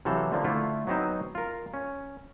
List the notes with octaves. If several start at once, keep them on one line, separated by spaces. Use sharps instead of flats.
C3 E3 F#3 A4 C5 F5
D3 F3 A#3
D3 A3 E4 F4
F#3 B3 C4 D#4 C5
F4 A#4
C#4